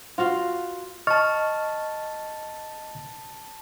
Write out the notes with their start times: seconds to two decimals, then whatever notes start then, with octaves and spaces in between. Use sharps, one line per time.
0.18 F4 F#4 F5
1.07 D#5 A5 C#6 F6 A6